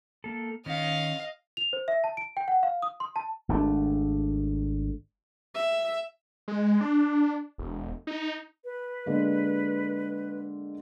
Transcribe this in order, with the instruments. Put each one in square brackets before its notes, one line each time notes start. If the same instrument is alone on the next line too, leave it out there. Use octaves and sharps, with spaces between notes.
[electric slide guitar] A#3 A4
[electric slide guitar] D#3 C#4 [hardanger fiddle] D#5 F5
[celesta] F7
C5
E5
A5
D7
G5
F#5
F5
D#6
C6
A5
[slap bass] G#1 A3 C#4 D4
[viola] E5
[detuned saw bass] G#3
D4
E1
D#4
[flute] B4
[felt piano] D3 G#3 A#3